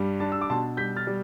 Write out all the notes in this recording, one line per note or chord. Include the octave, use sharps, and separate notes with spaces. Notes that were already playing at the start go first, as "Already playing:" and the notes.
Already playing: G2 G3
D4 A5
E6
D6
B2 A5 C6
G3 G6 B6
F6 A6
G3